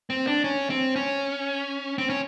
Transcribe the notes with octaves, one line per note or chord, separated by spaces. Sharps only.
C4
D4
C#4
C4
C#4
C4
C#4